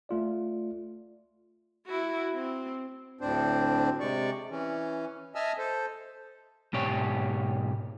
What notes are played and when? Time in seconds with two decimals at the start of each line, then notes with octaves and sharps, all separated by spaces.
0.09 A3 F4 D5
1.86 E4 F#4
2.34 C4
3.21 D2 A2 C4 D4 C5
4.00 C3 G#3 D5 C#6
4.51 E3 C#4
5.35 D#5 E5 G#5 A5 E6 F6
5.58 A4 C5
6.73 G#2 B2 G4 C#5